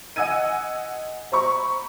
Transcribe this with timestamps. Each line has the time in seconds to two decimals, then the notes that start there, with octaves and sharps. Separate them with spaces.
0.16 D#5 F#5 G#5 E6 G#6 D#7
1.32 C5 A#5 B5 C#6